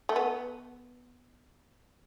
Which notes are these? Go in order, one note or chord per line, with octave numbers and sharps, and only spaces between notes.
A3
B3